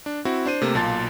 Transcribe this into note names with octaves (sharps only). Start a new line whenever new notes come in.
D4
C4 E4 F#4
D4 C5 D#7
C3 A3 A#3
B1 A#2 F4 A5 C6 A6